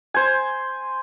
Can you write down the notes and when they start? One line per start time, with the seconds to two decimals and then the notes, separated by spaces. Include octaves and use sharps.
0.14 C5 G#5